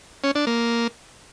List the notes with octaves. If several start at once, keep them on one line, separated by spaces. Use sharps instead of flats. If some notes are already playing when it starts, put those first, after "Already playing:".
C#4
D4
A#3